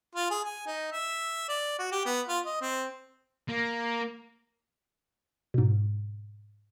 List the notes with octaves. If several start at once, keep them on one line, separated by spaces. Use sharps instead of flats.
F4
G#4
G#5
D#4
E5
D5
F#4
G4
B3
F4
D#5
C4
A#3
G#2 B2